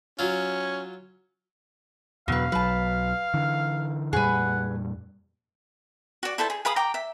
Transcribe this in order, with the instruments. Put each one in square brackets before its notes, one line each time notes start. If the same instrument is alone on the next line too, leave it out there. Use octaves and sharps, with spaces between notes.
[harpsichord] F#3 F4 [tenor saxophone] C#4
[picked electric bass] E2 B2 [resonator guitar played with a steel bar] F#3 B4 [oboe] F5
[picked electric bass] B1 F#3 [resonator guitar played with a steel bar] B4 A5
[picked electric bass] D3 E3
[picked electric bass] F2 A#2 G3 [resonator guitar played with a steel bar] G#4 B4 [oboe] F#5
[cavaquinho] F#4 D5
E4 A4 C5 A5
G#4
G#4 F5 B5 D#6
G5 A#5 D6
E5